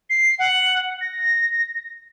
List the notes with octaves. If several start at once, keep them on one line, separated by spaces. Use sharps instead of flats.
C7
F#5
A#6